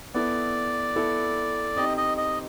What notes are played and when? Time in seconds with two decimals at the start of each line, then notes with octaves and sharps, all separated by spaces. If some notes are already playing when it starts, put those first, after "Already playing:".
0.14 B3 E4 A4 D5
0.96 B3 E4 A4
1.76 C4 D#4 G4 D#5
1.97 D#5
2.17 D#5